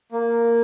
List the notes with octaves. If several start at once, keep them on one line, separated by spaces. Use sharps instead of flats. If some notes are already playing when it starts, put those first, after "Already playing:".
A#3